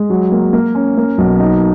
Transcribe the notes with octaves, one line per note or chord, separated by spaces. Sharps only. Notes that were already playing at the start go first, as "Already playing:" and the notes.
Already playing: G#3
F#3
A#3
A#3
C#4
A#3
B1
D#4